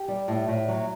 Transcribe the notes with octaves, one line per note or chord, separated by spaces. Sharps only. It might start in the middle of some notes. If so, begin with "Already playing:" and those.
Already playing: G4
G3
A2
A2
F#3